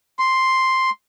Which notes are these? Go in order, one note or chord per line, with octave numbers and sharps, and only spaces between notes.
C6